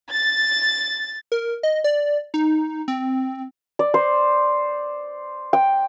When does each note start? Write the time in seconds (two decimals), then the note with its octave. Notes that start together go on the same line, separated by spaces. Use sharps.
0.11 A6
1.32 A#4
1.63 D#5
1.84 D5
2.34 D#4
2.88 C4
3.79 D5
3.94 C5
5.53 G5